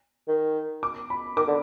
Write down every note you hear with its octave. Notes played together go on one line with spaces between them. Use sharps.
D#3
D6
B5
D#3 D6
D3